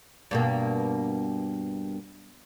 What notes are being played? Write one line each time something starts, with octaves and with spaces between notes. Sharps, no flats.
G2 B2 A#3